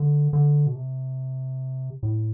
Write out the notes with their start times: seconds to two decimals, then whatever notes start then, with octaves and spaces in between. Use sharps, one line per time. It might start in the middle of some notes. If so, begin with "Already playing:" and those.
Already playing: D3
0.33 D3
0.67 B2
0.75 C3
2.03 A2